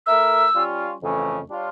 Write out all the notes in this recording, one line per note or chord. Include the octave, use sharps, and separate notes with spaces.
A3 E4 A#4 E5 E6
G3 C#4 F4
F2 C#3 E3 A3 C#4
G3 D4 F4 C#5